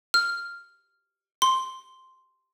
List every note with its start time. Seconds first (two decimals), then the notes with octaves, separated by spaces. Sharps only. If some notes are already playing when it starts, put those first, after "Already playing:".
0.14 F6
1.42 C6